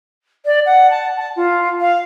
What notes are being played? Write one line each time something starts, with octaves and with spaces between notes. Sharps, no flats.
D5
F#5
A5
A5
F4
F5